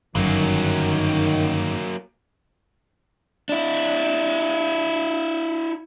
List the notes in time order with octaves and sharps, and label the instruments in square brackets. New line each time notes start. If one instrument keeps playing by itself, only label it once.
[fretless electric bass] G1 F#2 [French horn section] D#3 [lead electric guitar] F#3 A#3
[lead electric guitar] D4 E4